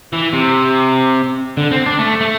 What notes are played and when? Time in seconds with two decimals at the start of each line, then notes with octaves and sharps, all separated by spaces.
0.13 E3
0.33 C3
1.57 D3
1.71 C4
1.86 D4
1.99 A3
2.21 A3